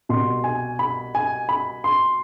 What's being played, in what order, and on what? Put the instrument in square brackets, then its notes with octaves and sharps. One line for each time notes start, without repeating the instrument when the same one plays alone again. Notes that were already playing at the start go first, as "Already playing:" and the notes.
[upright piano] C2 B2 C6
G#5
B5
G#5
B5
C6